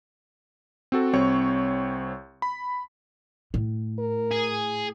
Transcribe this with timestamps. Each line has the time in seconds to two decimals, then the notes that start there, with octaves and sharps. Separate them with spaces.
0.92 C4 F#4 A4
1.13 C2 C4 C#5 C#6
2.42 B5
3.54 A2
3.99 A#4
4.31 G#4